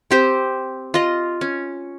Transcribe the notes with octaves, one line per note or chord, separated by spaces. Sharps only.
C4 G4 C5
F4 D#5
C#4